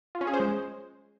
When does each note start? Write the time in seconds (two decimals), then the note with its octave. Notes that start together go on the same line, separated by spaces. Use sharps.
0.15 F4
0.21 C#4
0.27 G#4
0.34 C5
0.40 G#3